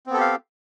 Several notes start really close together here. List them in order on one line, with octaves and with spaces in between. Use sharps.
C4 B3 A4 G4 F5